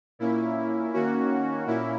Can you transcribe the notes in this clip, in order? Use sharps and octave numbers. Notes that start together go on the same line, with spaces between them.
A#2 A#3 C#4 E4
D#3 A#3 C#4 F#4
A#2 A#3 C#4 E4